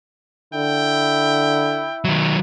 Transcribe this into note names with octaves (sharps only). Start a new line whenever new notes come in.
D3 E4 G5
D#3 F#3